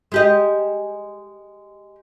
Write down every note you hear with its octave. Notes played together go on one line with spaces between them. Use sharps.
G#3 G4 D#5